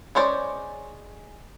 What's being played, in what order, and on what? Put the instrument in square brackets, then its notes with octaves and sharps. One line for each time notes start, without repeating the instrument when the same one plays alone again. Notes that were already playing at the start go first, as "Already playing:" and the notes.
[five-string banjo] G#3 C#4 C5 D5